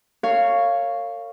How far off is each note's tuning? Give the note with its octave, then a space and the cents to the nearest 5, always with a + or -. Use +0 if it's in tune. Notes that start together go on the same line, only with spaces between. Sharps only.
A#4 -40 C#5 +0 F5 -5